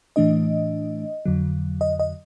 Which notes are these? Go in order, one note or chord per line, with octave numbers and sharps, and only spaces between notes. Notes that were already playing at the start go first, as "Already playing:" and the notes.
A2 E3 A3 D4 D#5
F2 D3 F#3
D#5
D#5